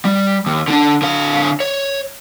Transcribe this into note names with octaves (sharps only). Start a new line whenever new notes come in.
G3
D#2
D3 D4
D3 F5
C#5